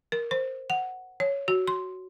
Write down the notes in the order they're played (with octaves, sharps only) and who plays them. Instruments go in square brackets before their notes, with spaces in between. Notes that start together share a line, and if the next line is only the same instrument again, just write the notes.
[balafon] A#4
C5
F#5
C#5
F#4
C6